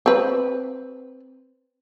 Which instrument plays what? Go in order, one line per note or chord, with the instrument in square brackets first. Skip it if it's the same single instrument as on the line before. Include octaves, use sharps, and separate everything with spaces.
[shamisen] C4 B4